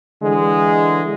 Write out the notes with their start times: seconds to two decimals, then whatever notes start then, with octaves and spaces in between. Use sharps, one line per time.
0.23 D3 E3 G#3